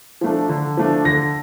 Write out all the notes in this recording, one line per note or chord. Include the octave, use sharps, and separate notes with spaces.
F3 A3 D4
D3
F3 A3 D4
D3 A#6